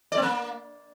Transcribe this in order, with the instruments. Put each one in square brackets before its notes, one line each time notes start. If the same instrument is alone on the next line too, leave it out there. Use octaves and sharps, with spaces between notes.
[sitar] D5
C4
A#3